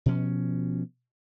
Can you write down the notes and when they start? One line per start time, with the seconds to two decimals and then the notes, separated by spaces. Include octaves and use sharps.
0.06 B2 F3 C#4